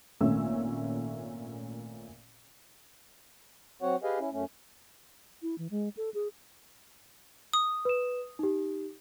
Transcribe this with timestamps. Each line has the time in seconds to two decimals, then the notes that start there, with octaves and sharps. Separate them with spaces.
0.21 G#1 A#2 A3 C#4 E5 E6
3.82 F#3 C4 F#4 C#5 F#5
4.03 G4 G#4 B4 D#5 F5 G#5
4.19 C#4 E4
4.32 F#2 A3 C#4
5.42 E4
5.58 E3
5.71 G#3
5.97 A4
6.14 G#4
7.53 D#6
7.85 B4 E7
8.39 D#4 G4